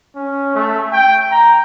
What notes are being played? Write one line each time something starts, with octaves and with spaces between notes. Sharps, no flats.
C#4
A3
G5
A#5